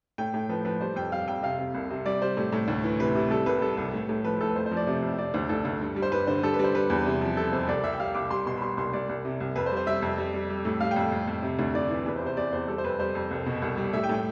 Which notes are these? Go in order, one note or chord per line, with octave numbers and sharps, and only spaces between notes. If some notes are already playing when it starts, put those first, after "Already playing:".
A2 G5
A2
F3 B4
F3 B4
G3 C5
F2 G5
G3 F5
F2 G5
C3 F5
C3
C2
C3
G3 D5
G3 C5
A2
A2
D2
E3
C3 B4
C3
G3 A4
C2 B4
G3 A4
C2
A2
A2
F3 B4
A2 A4
B4
F2 C5
C5
F3
D5
C3
F2
C3 D5
D2 C5
D2 A4
D2
G2
G3
C5
G2 B4
D3 C5
G3 A4
B4
G3 C5
G3 B4
E2
C3
F3
C3 A4
F2 C5
C2 D5
C2 E5
G5
G3 F5
C2 D6
G3 C6
B2 C6
B5
G3 C6
C2 C6
C2 D5
C2
C3
C2
F2 B4
C5
G3
C5
G3 E5
F2
G3
G3
G3
A2
G3 F5
G5
F2
F2
F2
C3
D2
D2 D5
E3
E2 B4
C5
C3
C5
E2 D5
E2 C5
G3 A4
C5
F2 B4
G3 C5
F2
C2
B2
C2
G3
A2 E5
G5
A2
G5